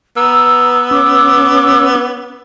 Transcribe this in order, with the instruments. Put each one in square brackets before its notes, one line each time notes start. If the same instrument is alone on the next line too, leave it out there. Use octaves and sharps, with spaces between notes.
[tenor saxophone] B3 [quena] A#5 [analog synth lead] E6
[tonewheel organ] C#4 [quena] D6